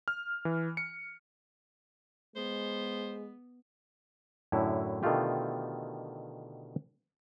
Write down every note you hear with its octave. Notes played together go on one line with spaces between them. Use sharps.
F6
E3
C#7
G#3 B3 C5
F#2 A2 D3 E4
B2 D3 D#3 A3 F4 G4